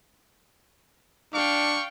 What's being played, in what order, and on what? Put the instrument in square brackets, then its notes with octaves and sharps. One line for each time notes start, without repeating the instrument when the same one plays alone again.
[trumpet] D4 [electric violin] F5 G5 [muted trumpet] C#6